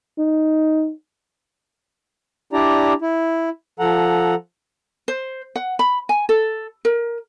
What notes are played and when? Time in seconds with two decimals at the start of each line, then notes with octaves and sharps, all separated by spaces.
0.18 D#4
2.53 D4 E4 G4 D5 A#5
3.02 E4
3.80 F3 A4 F#5 A#5
5.08 C5
5.56 F#5
5.79 B5
6.09 G#5
6.29 A4
6.85 A#4